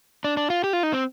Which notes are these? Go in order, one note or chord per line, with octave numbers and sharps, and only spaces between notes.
D4
D4
F4
G4
F4
D#4
C4